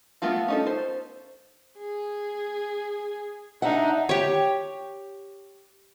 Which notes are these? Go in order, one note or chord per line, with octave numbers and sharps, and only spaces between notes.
A3 B3 F4 F#4
C#4 D#4 A4
C5
G#4
D4 D#4 E5 F#5
G4 C#5